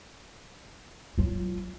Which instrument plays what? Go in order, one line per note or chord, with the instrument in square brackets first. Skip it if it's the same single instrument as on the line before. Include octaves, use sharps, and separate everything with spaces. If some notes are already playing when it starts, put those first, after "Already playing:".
[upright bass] F#3 F4